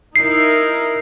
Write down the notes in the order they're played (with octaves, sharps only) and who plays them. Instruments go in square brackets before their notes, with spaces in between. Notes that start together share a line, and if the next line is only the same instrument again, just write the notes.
[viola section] D#4 E4 A#4 [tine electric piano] C7